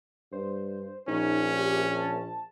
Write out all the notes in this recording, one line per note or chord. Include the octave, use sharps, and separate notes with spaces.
G2 C5
A#1 C#4 D#4
G4
A5